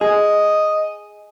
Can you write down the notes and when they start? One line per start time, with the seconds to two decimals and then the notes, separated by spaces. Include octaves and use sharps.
0.01 G#4 D#5